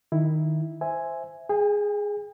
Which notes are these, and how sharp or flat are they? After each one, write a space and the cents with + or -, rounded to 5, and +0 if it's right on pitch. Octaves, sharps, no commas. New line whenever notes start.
D#3 -5 E4 +0
C5 +0 E5 +5 G#5 +0
G#4 +0 G5 +45